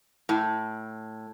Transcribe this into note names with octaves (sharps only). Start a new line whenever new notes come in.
A2